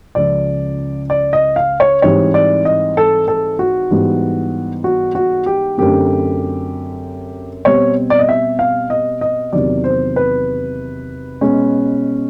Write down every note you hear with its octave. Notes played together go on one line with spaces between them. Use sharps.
C#2 C#3 F3 D5
D5
D#5
F5
C#5
G#2 E3 G3 C4 C#5
D5
D#5
A4
A4
F#4
G#2 E3 G3 B3
F#4
F#4
G4
F#2 D3 F#3 A3 C4 G4
B2 G3 C4 C#5
D5
D#5
E5
F5
D#5
D#5
E2 C3 D#3 F#3 D5
C5
B4
B2 G#3 C#4